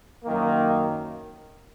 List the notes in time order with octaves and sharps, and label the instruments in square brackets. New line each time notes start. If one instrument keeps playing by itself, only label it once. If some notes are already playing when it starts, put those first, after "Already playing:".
[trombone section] F#2 D#3 A#3